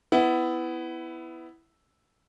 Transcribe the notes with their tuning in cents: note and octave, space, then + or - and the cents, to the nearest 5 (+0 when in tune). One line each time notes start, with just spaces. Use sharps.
B3 +20 E4 +0